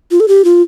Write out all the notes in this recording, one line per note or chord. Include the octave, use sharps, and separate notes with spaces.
F4
A4
G4
F4